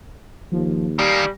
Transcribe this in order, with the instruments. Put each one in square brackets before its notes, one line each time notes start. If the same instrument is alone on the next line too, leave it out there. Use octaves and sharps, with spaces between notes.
[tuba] D#2 [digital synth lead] F3
[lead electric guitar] D#3 A#3 [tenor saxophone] G3 [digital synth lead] G#5